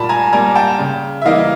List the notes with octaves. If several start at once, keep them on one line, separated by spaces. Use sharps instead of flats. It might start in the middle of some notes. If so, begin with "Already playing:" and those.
Already playing: A#2 G3 A#3 A5 B5
G#5 A#5
G3 A#3 G#5 A#5
G5 A5
C#3
E5
E3 G3 A#3 D#5 F5